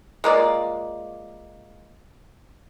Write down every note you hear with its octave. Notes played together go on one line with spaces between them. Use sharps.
G#3 A#3 F4 D5